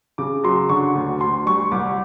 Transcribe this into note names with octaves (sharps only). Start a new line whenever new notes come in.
C#3 D6
F#3 C6
D3 C#6
D2
D2 C6
G3 C#6
C2 D6